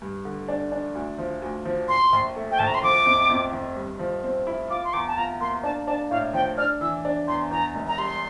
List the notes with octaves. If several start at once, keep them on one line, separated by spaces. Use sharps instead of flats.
G2
D3
D4
D4
D2
F3
D2
F3
A#2 C6
A#1
A3
G5
A#1 A5
A#5
C6
F3 D6
F2
F2
F2
G2
F3
C4
E4
F4 D6
C6
E2 D6
A5
F4 A#5
A#3 C6
D4 A5
D4 A5
A2 F5
F3 G5
D4 F6
E3 E6
D4
E2 C6
E2 A#5
E1
A#5
G3 C6